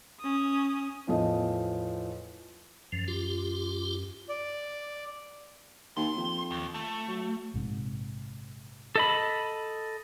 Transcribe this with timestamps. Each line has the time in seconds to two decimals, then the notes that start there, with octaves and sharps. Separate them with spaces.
0.20 C#4 D#6
1.07 E2 A2 F3 D#5
2.92 F#2 F3
3.08 F4 G4
4.29 D5
5.97 D#2 C6
6.17 F2
6.51 D#2
6.74 A3
7.08 F#3
7.54 A#1 G#2 C3
8.96 A4 D#5 B5